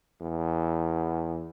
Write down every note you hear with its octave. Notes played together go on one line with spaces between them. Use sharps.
E2